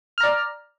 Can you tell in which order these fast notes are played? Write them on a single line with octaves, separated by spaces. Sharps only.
F6 A#5 D5